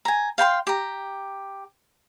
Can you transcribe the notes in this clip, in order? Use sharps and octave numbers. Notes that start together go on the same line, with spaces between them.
G#5 A#5
F5 G5 B5 C6
G4 A#5